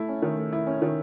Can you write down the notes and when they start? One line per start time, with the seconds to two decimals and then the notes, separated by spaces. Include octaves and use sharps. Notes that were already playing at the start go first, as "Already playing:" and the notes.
Already playing: A3 E4
0.09 C#4
0.22 D#3
0.37 A3
0.53 E4
0.67 C#4
0.82 D#3